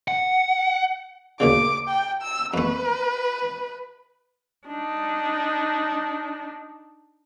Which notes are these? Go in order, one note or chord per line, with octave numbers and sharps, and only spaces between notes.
F#5
D2 A#2 C#3 D6
G5
E6
F2 A3 B4
D4 D#4